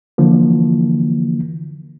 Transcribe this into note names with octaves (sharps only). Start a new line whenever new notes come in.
D3 E3 F3 A#3